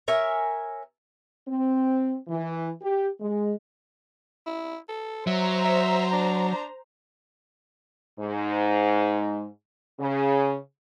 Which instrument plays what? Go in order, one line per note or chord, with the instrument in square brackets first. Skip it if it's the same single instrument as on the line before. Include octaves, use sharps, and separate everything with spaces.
[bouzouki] A#4 C#5 E5 G#5
[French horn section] C4
E3
G4
G#3
[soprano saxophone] E4
A4
[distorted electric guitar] F#3 [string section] C5 A#5 [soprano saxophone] E5
[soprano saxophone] E5
D4
[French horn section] G#2
C#3